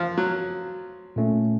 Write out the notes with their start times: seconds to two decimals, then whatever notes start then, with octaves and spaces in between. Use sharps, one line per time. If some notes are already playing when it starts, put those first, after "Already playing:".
Already playing: F3
0.17 F#3
1.16 A#2 A3 C#4